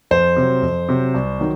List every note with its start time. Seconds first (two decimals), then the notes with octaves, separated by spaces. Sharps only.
0.11 F2 C5
0.37 C3 F#3
0.62 F2
0.89 C3 F#3
1.14 C2
1.39 D#3 F#3